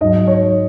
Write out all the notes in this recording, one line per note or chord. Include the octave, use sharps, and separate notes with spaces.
G#2 F#3 D#5
C#5